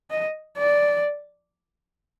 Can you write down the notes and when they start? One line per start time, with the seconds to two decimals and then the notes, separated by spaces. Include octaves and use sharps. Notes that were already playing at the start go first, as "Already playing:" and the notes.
0.10 D#5
0.58 D5